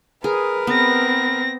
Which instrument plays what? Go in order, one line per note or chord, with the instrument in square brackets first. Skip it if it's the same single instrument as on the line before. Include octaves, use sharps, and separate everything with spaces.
[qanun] G#4 [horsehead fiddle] A#4 B4
[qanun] B3 [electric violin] C4 A#6